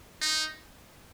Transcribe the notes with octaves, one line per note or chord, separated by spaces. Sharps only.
D#4